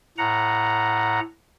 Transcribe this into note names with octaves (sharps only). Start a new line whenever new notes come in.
A2 F#5 A#5